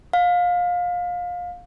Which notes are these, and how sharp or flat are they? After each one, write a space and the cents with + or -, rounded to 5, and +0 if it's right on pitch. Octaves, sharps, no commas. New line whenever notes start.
F5 +25